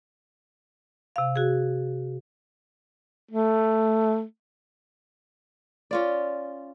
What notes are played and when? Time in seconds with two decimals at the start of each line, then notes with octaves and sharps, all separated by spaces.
1.16 C3 F5
1.36 F#4 G#4
3.32 A3
5.91 C#4 F4 D5